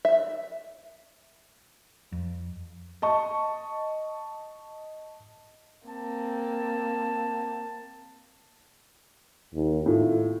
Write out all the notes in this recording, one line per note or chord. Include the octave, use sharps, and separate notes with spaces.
E5
F2
D#5 A5 C#6
A#3 C4 A5
D#2
A2 F4